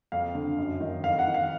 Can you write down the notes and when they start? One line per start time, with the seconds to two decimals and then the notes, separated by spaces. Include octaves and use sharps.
0.12 F2 F5
0.35 D3
0.58 F#2
0.81 D#3
1.04 F2 F5
1.19 F#5
1.27 D#3
1.34 F5